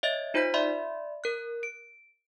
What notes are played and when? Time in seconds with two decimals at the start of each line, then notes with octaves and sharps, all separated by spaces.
0.03 C#5 D#5 E5 A6
0.34 D#4 F4 C5 B5 G6 B6
0.54 D5 E5 B5 C6
1.24 A#4 F#6
1.63 D7